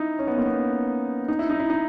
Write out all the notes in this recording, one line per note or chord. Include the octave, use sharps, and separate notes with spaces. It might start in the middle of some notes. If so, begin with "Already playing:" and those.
Already playing: D#4 E4
C#4
B3
A#3
B3
D#4
E4
D#4
E4
D#4